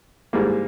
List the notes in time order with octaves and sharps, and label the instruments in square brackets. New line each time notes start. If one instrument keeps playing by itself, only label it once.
[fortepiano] G#2 G3 A#3